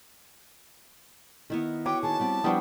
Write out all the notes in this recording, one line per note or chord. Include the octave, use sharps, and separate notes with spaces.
D#3 B3 E4 A#4
F#4 B4 C#5 G5 D6
D#2 D#3 G#4 A5
G3 B3 C4
F3 G3 B3 D4 E4 B4 G5 C#6